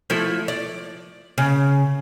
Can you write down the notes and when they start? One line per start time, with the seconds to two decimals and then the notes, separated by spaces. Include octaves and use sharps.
0.10 F3 A3 E4
0.48 D5
1.38 C#3